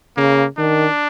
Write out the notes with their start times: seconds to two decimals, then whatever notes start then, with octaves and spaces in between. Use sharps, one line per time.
0.17 C#3 A#3
0.58 D#3 D4